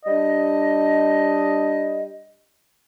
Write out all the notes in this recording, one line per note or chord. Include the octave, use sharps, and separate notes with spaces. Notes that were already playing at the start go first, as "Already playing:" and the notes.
G3 D4 D#5